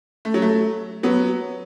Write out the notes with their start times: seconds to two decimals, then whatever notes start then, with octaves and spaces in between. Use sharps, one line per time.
0.25 A3
0.34 F#3
0.42 A3
1.03 F#3 B3